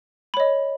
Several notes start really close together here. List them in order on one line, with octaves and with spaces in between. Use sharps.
B5 C#5 D#5